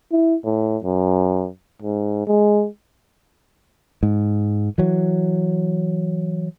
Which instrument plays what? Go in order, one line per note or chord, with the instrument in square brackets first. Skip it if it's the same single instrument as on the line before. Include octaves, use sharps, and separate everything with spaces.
[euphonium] E4
A2
F#2
G#2
G#3
[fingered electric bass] G#2
E3 F#3